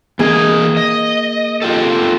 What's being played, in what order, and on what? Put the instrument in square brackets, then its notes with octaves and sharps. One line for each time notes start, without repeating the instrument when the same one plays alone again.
[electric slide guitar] E3 D#5 [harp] A#3 G#4
[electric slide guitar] D#5
F4 G4 A4